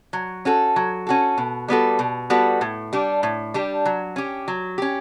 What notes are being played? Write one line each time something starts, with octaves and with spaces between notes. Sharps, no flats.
F#3
C#4 F#4 A4
F#3
C#4 F#4 A4
B2
G3 B3 F#4 A4
B2
G3 B3 F#4 A4
A2
G3 D4 G4
A2
G3 D4 G4
F#3
C#4 G4
F#3
C#4 G4